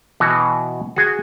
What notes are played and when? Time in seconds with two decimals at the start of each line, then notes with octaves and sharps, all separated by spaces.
0.20 B2 E3 F#4
0.96 F#4 G#4